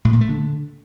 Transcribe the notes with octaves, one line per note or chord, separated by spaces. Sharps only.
A2
A#2
A3
D3